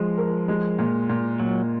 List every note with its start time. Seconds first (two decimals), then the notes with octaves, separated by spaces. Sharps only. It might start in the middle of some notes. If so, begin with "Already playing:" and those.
Already playing: F3 G#3
0.18 A#4
0.48 G#3
0.79 A#2
1.09 A#2
1.39 A#2 F#3